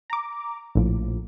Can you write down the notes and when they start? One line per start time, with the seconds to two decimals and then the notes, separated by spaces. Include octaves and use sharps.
0.10 A#5 D6
0.75 A#1 A2 F3